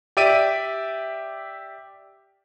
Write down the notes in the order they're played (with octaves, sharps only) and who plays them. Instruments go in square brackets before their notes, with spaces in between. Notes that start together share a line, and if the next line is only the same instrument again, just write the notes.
[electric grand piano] G4 D5 E5 D7 D#7